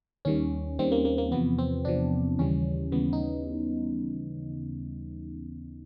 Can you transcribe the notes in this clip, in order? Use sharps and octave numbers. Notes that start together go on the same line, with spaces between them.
D#2 D#3 G3 C#4
D#2 D#3 G3 C4
A#3
A#3
A#3
E2 C3 F3 B3
C4
E2 C3 F3 D4
D#2 C#3 E3 G3 C#4
D#2 C#3 E3 G3 B3
D#4